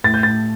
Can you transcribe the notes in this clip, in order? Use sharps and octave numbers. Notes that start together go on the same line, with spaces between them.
A2 A6
G6
A2 A6